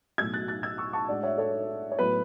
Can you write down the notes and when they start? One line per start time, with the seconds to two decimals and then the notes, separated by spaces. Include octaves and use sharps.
0.18 B1 A2 F#3 A3 E6 G#6
0.34 F#6 A6
0.48 F#6 A6
0.63 E6 G#6
0.78 C#6 E6
0.93 A5 C#6
1.08 A2 G#3 D4 D5 F#5
1.23 C#5 E5
1.38 A4 C#5
1.92 C#5
1.98 A2 F#3 B3 B4